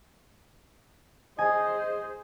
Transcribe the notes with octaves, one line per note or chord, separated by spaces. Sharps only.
G#4 C5 D#5 G#5